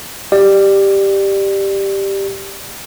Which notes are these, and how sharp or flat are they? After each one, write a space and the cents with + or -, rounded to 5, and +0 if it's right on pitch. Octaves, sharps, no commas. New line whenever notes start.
G4 +0 D5 +20